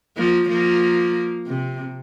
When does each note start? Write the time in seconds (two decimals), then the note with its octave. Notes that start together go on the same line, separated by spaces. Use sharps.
0.17 F3 A#3
0.49 F3 A#3
1.47 C3